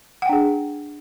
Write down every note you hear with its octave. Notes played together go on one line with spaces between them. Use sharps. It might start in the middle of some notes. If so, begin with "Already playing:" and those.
D4 G#4 F#5 G5